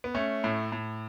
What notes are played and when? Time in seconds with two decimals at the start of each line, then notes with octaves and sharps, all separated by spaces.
0.04 B3
0.14 A3 C#4
0.44 A2
0.72 A2